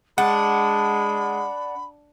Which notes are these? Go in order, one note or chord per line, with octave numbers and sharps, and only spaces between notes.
G#3 D4 F#5 B5